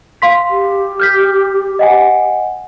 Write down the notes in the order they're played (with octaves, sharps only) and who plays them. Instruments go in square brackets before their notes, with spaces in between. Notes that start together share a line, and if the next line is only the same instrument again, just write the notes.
[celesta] F5 C6 B6
[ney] G4
[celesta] F6 G6 B6
D#5 F#5 G#5